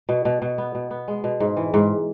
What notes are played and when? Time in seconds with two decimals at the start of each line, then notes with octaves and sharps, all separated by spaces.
0.09 B2
0.25 B2
0.42 B2
0.58 B3
0.75 B2
0.91 B3
1.08 G#3
1.24 B2
1.40 G#2
1.57 E3
1.74 G#2